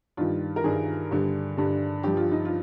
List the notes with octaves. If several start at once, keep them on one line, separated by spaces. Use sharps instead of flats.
G2 D#3 G3 F4
A#4
G2 D#3 G3 G#4
G2 D3 G3
G2 D3 G3
G2 F3 G4
F4
D#4
F4